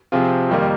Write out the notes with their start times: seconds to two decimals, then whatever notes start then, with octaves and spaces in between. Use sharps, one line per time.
0.12 C3 F3 C4 F4 G#4
0.50 F2 D#3 G3 A#3 F4